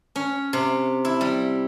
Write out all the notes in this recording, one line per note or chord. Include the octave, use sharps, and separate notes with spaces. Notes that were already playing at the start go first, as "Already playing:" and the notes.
C#4
C3
E4
G3